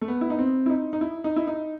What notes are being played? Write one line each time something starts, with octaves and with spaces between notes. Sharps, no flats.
A3
B3
E4
D#4
C4
E4
D#4
D#4
E4
D#4
E4
D#4